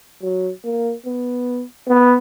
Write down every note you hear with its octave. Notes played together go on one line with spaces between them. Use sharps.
F#3
A#3
B3
B3